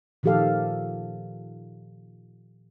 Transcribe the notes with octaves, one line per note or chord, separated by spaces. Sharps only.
A#2 D#3 F3 G4 A4 F5